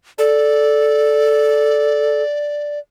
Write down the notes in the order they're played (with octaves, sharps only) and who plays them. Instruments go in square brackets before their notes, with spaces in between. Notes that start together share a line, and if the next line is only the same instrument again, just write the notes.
[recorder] A4 [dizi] D5